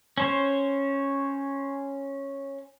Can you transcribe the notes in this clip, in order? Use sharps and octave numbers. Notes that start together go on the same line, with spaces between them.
C#4 C5 C#5